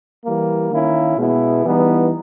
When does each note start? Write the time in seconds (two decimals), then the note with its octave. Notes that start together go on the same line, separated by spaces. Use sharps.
0.24 E3 G3 A#3
0.71 D#3 A#3 C#4 E4
1.17 B2 G#3 B3 E4
1.64 E3 G3 B3 D#4